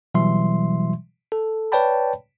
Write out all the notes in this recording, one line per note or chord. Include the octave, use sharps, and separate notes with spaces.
B2 E3 F#3 G3 E5 C6
A4
B4 C#5 D5 G5 A5 B5